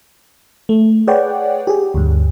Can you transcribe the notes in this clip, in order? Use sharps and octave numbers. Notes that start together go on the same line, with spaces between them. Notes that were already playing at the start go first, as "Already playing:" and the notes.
A3
G#4 B4 C#5 D5 F#5 G5
G4 G#4
D2 G2